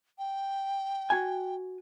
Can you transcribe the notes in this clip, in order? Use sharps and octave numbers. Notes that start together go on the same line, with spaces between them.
G5
F#4 G#5